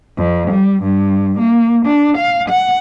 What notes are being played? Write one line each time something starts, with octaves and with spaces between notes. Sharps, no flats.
F2
G3
G2
A#3
D4
F5
F#5